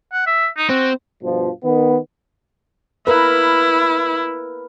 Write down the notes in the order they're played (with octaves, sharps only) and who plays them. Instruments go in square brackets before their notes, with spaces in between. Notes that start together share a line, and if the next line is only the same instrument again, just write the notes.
[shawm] F#5
E5
D#4
[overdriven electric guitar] C4 [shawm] F#4
[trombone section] G2 B2 F3
D#3 B3
[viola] E4 [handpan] A#4 B4